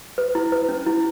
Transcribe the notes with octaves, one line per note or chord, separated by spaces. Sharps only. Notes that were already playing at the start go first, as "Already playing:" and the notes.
B4
E4
B4
C#4
E4